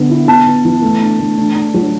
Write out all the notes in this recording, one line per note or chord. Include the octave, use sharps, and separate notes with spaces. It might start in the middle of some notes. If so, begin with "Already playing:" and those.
Already playing: D3 B3
E4
B3 A5
B3
E3
A3
D4
A3
D4
D4
F#3